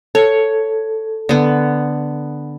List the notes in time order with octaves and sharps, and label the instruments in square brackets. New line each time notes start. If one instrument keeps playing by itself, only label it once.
[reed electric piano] A4 [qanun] C#5
[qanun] D3 B3